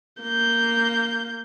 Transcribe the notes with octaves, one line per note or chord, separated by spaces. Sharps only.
A#3 G6